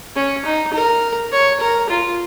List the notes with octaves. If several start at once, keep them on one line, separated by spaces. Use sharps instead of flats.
C#4
D#4
A#4
C#5
A#4
F4